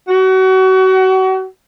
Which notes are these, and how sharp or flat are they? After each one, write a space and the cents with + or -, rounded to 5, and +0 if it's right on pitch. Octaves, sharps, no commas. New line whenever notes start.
F#4 +30